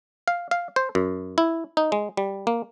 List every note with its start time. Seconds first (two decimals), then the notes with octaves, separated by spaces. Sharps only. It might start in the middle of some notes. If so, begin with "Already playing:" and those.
0.28 F5
0.51 F5
0.76 C5
0.95 F#2
1.38 E4
1.77 D#4
1.92 G#3
2.17 G3
2.47 A#3